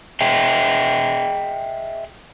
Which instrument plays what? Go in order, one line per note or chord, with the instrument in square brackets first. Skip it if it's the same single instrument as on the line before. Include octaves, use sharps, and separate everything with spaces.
[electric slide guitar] G#4 D#5 E5 G5